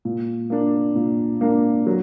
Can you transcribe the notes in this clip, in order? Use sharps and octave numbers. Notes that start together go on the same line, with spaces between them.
A#2
A#3 D4
A#2
A#3 D4
F#3